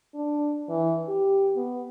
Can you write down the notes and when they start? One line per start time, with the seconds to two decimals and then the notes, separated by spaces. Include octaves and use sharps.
0.15 D4
0.69 E3
1.08 G4
1.57 B3